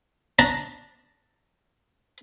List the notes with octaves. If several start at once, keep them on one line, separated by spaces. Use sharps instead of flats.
D4 A5 A#5